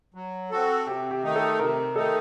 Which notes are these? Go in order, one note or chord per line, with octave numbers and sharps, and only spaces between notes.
F#3
C4 F#4 A4
C3 G4
G4
D#3 A3 D#4
A4
C3 A#4
D#3 A3 D#4 A4